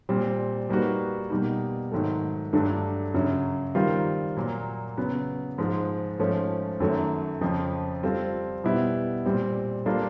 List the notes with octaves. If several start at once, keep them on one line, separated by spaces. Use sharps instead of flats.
A#2 G3 C4
G3 A#3 D#4 F#4 B4
B2 G3 A#3 D#4
G#2 D#3 F#3 A3
G2 D3 F#3 A3 D4
F#2 C#3 F#3
D#3 G3 C4 F4 A#4
A#2 F#3 A#3
C#3 F#3 B3
G#2 F3 G#3
G#2 F3 A3 C#4
F#2 D#3 F#3 A3
F2 C#3 F3
G3 C4 F4 A4
B2 G3 B3 E4
A#2 G3 C4
G3 A#3 D4 F4 A4